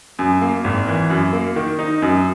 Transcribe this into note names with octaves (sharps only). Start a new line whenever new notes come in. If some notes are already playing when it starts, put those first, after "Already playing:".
F#2
A#3
G#1
E3
F#2
A#3
D#3
D#4
F#2